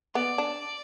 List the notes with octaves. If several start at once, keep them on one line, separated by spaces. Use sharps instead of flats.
B3 D5
D4